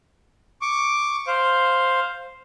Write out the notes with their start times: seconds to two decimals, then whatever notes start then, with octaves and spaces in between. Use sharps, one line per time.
0.62 C#6 D6
1.27 C5 F5